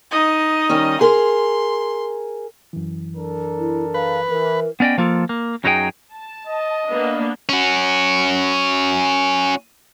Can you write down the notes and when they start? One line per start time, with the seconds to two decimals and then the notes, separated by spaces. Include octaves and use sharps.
0.11 D#4 D#5
0.69 D#3 G3 C#4
1.01 G#4 A#4 C6
2.73 F#2 E3
3.17 D4 A4 A#4
3.59 E4
3.94 B4 F5
4.30 E3 A#4
4.80 B3 C#4 D5 D#5 G5
4.98 F3 A#3 F4 A4
5.29 A#3
5.64 F#2 F#3 D#4 E4 G#4 G5
6.14 A5
6.47 D#5
6.88 A#3 B3 D4
7.49 C#4 F#4